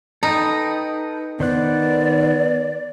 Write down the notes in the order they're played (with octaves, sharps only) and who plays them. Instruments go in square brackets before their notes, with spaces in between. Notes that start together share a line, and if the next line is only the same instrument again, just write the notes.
[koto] D#4 [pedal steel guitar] A4 B4 G5
[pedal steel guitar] D#3 C5 F#6 [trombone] B3 [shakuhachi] D5